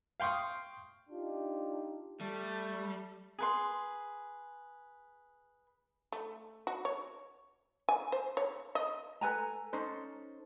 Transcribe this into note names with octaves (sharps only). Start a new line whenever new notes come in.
F5 G5 C6 C#6 D#6
D4 D#4 F4 G4
G3 A3
G#4 B4 C6
A3
F#4
C#5
G#5
C5
C#5
D#5
A4 B4 G#5 A#5
C#4 D#4 A4 C5